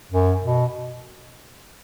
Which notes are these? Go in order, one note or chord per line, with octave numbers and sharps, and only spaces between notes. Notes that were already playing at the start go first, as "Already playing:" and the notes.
F#2
B2